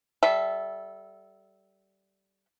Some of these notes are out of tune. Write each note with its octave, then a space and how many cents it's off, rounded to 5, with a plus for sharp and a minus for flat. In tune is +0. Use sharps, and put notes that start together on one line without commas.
G3 -20 A4 -15 E5 +0